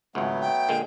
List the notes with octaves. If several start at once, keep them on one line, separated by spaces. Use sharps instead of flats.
G#1 C#2 F#3 A3 B3
G5
A#2 D3 G#3